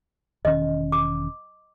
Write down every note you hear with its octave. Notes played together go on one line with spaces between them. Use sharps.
E1 D#3 C#4 D#5
D6